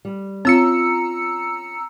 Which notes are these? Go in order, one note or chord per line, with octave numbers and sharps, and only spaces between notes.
G3
C4 C#4 F4 A#5 E6 C#7